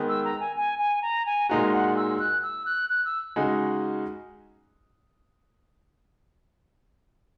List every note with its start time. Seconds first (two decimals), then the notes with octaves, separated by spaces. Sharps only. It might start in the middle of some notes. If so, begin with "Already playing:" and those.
Already playing: D#3 G#3 B3
0.09 E6
0.25 A#5
0.40 G#5
0.57 G#5
0.79 G#5
1.02 A#5
1.26 G#5
1.49 A#2 G#3 D#4 F#4 A#5
1.73 F#5
1.97 E6
2.19 F#6
2.42 E6
2.66 F#6
2.90 F#6
3.05 E6
3.36 C#3 G#3 D#4 F#4